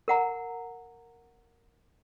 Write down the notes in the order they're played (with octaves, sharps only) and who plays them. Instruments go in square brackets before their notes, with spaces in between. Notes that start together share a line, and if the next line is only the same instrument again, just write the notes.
[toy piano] A#4 F#5 A#5